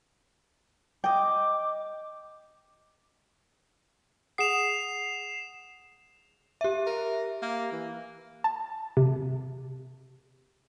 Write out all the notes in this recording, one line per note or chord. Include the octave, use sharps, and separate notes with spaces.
D#5 G5 D6
G#4 F#5 D#6 C7 E7 F7
G4 E5
A#4
A#3
E3
A5
C3